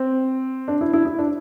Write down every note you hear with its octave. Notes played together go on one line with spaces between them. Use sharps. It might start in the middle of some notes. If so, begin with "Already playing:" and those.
Already playing: C4
D4
E4
E4
E4
D4